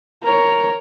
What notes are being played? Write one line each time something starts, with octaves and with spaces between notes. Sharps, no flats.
A#4 C#5